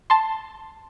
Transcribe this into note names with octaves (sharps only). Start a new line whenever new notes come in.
A5 C6